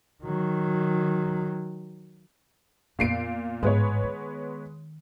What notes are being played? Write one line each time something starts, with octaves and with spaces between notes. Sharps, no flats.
D#3 F#3
F2 A#2 B3 C7 D7
A1 G#2 G#3 B3 C#5
D#3